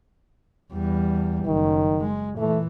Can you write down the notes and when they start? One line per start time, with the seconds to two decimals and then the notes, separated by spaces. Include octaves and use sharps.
0.73 E2 G3
1.45 F#1 D#3
2.00 G#3
2.37 A#2 E3 A3